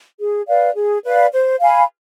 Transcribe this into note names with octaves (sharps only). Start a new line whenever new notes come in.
G#4
B4 D5 F5
G#4
B4 D5 F5
C5
F5 G#5 B5